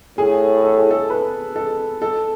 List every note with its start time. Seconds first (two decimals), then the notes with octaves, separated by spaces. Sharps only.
0.18 A2 G#4
0.64 A4
0.78 G#4
0.91 A4
1.10 B4
1.56 A4
2.02 A4